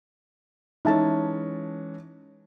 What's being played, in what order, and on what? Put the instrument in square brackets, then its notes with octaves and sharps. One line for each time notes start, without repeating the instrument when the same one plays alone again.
[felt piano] E3 G#3 C#4 [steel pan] D#4 E5 A5